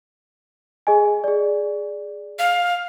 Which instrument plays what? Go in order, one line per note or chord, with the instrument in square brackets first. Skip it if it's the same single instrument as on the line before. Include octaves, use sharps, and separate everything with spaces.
[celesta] G#4 D#5 G#5
G#4 D5
[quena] F5